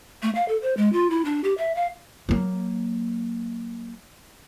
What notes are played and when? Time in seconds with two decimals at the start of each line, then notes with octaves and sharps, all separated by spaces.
0.22 A3
0.35 F5
0.48 A4
0.62 C5
0.77 G#3
0.93 F4
1.10 E4
1.25 D4
1.44 G4
1.58 E5
1.76 F5
2.29 F#3 A#3